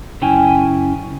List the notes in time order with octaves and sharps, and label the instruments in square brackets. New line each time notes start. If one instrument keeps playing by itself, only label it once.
[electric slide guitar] F#2 C#3 C#4 E4 G5 G#5